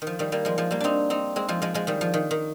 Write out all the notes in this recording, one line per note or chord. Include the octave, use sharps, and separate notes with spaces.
D#3
F3
D#3 G3
G3 A#3
F3 G#3
F3 G#3
G3 A#3
C4 D4 D#4
C4 D#4
G#3 C4
F3 G#3
F3 G#3
F3 G#3
D#3 G3
F3
D#3
D#3